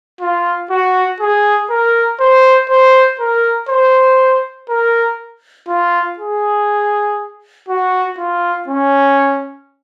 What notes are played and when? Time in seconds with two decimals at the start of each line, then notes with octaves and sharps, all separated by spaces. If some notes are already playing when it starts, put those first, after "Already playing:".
0.21 F4
0.70 F#4
1.20 G#4
1.70 A#4
2.20 C5
2.70 C5
3.20 A#4
3.69 C5
4.69 A#4
5.68 F4
6.18 G#4
7.69 F#4
8.18 F4
8.68 C#4